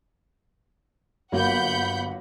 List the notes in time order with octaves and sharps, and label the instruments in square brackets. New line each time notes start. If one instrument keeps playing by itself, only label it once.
[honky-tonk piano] G1 [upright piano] F#3 A#3 [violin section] F#5 B5 G6